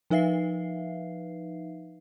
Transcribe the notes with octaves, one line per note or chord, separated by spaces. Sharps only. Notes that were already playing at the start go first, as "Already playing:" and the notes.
F3 D#4 B4 E5 F5 C7